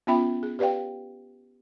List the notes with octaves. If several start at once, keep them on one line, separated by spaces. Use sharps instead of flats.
B3 C#4 F4 E5 G5 B5
G#4
G4 B4 D5 F5 G5